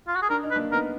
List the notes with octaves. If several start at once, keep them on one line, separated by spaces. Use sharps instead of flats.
F4
F#4
G#4
D4 A#4
D#4
B4
A#3 D4
B3 D#4 A#4